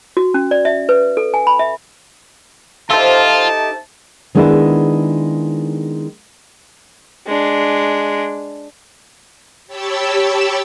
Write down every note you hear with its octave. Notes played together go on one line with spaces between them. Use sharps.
F#4
C#4
D5
E5
B4
A4
G#5
B5
E5
D#4 F4 G4 A4 C5 E5 A5
D#3 G#3 B3 D4 E4
G#3 D4
G4 C#5 G5 A5 B5 E6